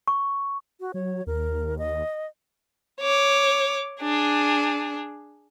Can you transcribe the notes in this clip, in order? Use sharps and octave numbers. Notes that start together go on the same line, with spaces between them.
C#6
F#4
F#3 C#5
D#2 A#4
D#5
C#5 D6
D4 G#4